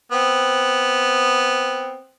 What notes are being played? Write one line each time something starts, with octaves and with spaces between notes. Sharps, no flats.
B3 C4